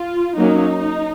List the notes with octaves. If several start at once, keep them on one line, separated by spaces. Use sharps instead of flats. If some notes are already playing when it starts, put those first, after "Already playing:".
Already playing: F4
F#3 A#3 C#4 D#4